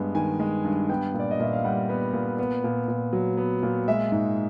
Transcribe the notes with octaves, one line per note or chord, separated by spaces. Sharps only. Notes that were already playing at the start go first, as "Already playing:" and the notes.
Already playing: G2 G#3 B3
D#3 G#5
G#3
G2
B3 G5
A#2
D5
D#5
A#2 E5
F5
G3 F#5
B3
A#2
B3
A#2
A#2
F#3
B3
A#2
G#3 E5
G#2